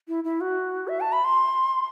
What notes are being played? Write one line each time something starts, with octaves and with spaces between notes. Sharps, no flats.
E4
E4
F#4
E5
A5
B5
C6